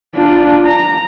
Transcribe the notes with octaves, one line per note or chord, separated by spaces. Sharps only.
D4 F4
A#5